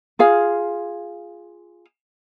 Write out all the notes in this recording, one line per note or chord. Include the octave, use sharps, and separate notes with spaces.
F4 G#4 F5